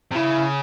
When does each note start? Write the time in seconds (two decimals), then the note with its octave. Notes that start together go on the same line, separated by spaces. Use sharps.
0.11 C3
0.15 C#3 E4